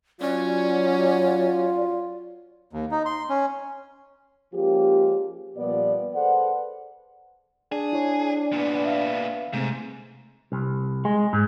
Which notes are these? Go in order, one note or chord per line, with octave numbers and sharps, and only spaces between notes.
F#3 C#4 F4 D5
D#2
D#4
C6
C#4
F3 G#3 A#3 C#4 F4 G4
A#2 F3 G3 B3 D5
G#4 A4 B4 C5 D5 F#5
D4 G#4
E4 C#5
A#2 B3
E5 F5
G#2 C3 A3 C4
C2
G#3
G#2